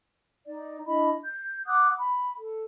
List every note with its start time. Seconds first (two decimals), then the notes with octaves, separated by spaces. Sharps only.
0.45 D#4 D5
0.86 D4 E4 D#5 B5
1.24 G6
1.66 F#5 D6 D#6 F#6
1.98 B5
2.36 A4